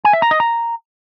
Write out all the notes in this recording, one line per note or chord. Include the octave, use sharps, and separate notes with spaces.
G#5
E5
A#5
D#5
A#5